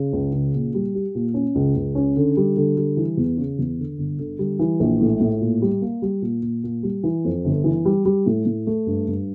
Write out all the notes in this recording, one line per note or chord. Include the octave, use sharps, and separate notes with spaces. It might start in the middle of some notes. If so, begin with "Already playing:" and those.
Already playing: C#3
C#2
C#3
A#2
G3
G4
A#2
C#4
C#2
C#2
C#4
D3
G3
D3
G3
E3
E2
C#3
E2
D3
G1
D3
G3
E3
A#1
A2
A2
A#2
G3
A#3
G3
A#2
A#2
A#2
G3
E3
F2
G1
E3
G3
G3
A2
A2
A3
G2
G2